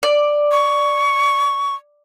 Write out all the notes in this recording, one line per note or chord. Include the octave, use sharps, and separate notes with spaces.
D5
C#6